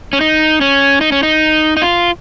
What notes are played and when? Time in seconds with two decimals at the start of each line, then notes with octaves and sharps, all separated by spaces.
0.13 C#4
0.21 D#4
0.61 C#4
1.01 D#4
1.12 C#4
1.23 D#4
1.77 D#4
1.82 F4